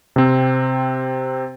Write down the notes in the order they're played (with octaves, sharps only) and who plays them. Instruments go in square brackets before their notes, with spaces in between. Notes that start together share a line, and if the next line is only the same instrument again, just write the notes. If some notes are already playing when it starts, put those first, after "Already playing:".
[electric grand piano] C3 C4